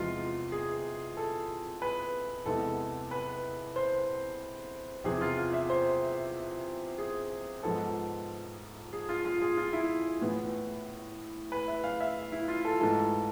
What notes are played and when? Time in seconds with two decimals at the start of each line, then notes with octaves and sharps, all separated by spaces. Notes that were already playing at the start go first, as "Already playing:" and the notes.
Already playing: E2 C3 F3 G#3 F4
0.52 G#4
1.17 A4
1.82 B4
2.46 E2 C3 E3 G#3 B3 A4
3.11 B4
3.76 C5
5.04 E2 C3 F3 G#4
5.21 F4
5.37 F4
5.53 E5
5.70 C5
6.98 G#4
7.63 G#2 F3 B3 A4
8.93 G#4
9.09 F4
9.25 F4
9.41 G#4
9.57 F4
9.73 E4
10.21 A2 E3 B3
11.52 B4
11.68 E5
11.84 F5
12.00 E5
12.32 E4
12.48 F4
12.65 A4
12.80 G#2 E3 A3 A4